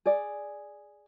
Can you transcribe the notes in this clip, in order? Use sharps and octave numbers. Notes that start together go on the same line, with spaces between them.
G#4 D5